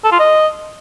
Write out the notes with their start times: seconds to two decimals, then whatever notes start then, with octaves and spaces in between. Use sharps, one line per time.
0.04 A4
0.12 F4
0.19 D#5